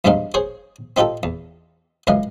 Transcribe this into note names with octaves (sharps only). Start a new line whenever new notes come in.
E2 G2 G3 C4 D#4 F5
G#4 C5 C#5
C4 D#4 F4 G4 A4
E2
C#2 F#2 E3 D#5 F5